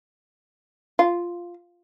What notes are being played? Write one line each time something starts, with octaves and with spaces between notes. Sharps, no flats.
F4